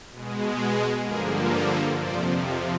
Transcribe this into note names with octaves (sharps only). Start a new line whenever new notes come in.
B2 G#3
G#4
G2 D3 F3 A#3 G#4 A#4
A4
F2 C3 F3 C5 D5